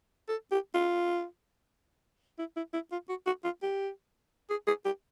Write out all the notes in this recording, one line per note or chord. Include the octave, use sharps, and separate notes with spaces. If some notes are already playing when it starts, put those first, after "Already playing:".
A4
G4
F4
E4
E4
E4
F4
F#4
F#4
F4
G4
G#4
G#4
G4